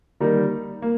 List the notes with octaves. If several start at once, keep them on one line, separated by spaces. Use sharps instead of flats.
D#3 G3 A#3 D#4 A#4
A#3